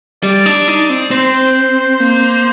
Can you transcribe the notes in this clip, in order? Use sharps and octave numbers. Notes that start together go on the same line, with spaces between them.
G3 D5
D4
D#4
C4
C4 C5
A#3